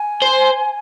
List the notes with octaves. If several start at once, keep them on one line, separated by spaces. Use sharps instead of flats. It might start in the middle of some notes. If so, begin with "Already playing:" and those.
Already playing: G#5
C5